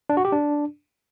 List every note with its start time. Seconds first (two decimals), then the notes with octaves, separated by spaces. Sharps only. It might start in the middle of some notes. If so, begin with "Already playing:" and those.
0.10 D4
0.17 F#4
0.25 G4
0.32 D4